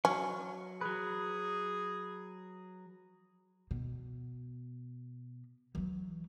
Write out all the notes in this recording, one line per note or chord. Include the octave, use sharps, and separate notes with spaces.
F#3 C#4
F#3 G#4 B4
B2
E3 F#3